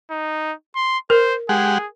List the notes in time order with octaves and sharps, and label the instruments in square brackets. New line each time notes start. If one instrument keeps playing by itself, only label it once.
[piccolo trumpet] D#4
C6
[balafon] A#4 [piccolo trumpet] C5
[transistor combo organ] G#3 G4 F#5 [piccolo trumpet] G#4